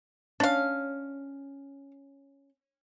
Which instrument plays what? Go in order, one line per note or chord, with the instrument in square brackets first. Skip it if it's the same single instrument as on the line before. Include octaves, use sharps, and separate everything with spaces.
[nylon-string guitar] C#4 [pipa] D4 F5